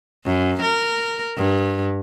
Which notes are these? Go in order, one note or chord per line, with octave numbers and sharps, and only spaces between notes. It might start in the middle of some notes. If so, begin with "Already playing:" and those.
F#2
A#4
G2